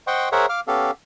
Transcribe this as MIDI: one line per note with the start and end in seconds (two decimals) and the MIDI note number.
0.07 0.29 72
0.07 0.29 75
0.07 0.29 78
0.07 0.29 79
0.07 0.29 84
0.07 0.29 85
0.32 0.46 68
0.32 0.46 70
0.32 0.46 72
0.32 0.46 73
0.32 0.46 76
0.32 0.46 78
0.49 0.60 77
0.49 0.60 86
0.49 0.60 89
0.68 0.91 59
0.68 0.91 61
0.68 0.91 67
0.68 0.91 69
0.68 0.91 77